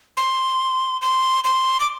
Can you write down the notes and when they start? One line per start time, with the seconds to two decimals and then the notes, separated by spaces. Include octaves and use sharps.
0.17 C6
1.02 C6
1.44 C6
1.80 D6